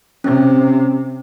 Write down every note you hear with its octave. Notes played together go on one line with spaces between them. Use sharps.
C3 C#4